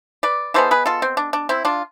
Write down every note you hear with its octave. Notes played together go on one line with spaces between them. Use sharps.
B4 D5
E3 G#3 B3 A4 C5
G#4 B4
F4 A4
C4
D4
D4
C4 E4
D4 F4